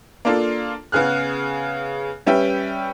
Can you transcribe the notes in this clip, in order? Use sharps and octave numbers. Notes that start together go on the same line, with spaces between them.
A#3 D4 F4 A4
C#3 B3 G#4 F6 F#6
G3 C#4 B4 E5 G5